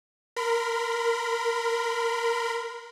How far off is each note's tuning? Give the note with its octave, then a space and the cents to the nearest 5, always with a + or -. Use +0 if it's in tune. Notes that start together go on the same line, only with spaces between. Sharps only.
A#4 +0 B5 +35